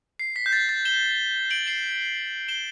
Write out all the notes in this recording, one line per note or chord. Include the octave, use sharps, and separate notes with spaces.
C7
B6
G6
A6
A6
E7 G7
D7 F#7
C7 E7
E7 G7